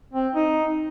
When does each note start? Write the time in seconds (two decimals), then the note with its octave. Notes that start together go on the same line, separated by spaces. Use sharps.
0.13 C4
0.35 D#4